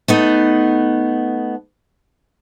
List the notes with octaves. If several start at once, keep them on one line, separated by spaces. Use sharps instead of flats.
A3 B3 D#4